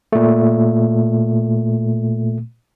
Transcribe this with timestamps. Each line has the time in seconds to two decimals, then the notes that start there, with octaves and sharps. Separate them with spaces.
0.13 A#2 A3